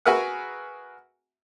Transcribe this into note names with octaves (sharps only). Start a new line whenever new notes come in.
F#4 G#4 A#4 B4 E5 F#5